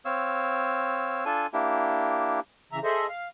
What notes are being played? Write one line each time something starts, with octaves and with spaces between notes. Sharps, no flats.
C4 C#5 F5 E6
D4 F4 A4 G#5
A#3 D4 E4 G4
C#3 E3 E5 A#5
G#4 A4 C5 D#5 E5
F5